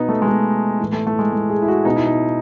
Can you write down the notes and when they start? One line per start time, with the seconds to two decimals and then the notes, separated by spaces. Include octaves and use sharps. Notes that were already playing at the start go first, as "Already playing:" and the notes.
Already playing: B2 B3 D#4
0.09 A3
0.22 G#3
0.27 A3
0.80 A2 E3
0.92 A3
1.07 A3
1.19 G#3
1.33 A3
1.50 G#4
1.62 E4
1.68 F#4
1.85 B2 D#4
1.96 E4
2.06 D#4